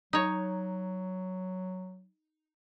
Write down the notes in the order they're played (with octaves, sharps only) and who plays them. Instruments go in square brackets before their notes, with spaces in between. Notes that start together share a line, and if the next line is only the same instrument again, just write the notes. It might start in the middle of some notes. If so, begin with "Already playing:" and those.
[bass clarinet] F#3 [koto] D#4 C#5